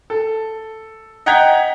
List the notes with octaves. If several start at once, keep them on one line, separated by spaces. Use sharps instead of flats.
A4
D#5 F#5 G5 A#5 G#6 B6